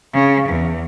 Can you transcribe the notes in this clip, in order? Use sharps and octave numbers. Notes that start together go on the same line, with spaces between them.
C#3
E2